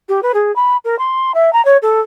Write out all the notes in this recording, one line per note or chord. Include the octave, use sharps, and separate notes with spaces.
G4
B4
G#4
B5
A#4
C6
E5
A#5
C#5
A4